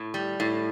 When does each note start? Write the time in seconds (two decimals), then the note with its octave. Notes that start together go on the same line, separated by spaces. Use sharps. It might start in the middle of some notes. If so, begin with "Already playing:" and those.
Already playing: A2
0.14 G3
0.40 A2